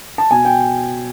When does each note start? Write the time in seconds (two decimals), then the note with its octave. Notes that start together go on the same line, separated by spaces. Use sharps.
0.18 A5
0.31 B2 G#5
0.45 G5